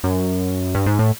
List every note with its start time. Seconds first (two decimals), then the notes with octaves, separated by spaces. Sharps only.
0.04 F#2
0.75 G2
0.86 G#2
0.99 A2